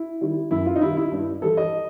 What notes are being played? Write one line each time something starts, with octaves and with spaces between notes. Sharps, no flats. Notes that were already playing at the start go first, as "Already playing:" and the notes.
Already playing: E4
D#3 G3
F#2 E4
F4
D#4
D#3 G3 E4
E4
G2
E3 G3 A4
D#5